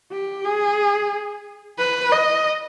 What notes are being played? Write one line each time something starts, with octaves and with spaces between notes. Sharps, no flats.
G4
G#4
B4
D#5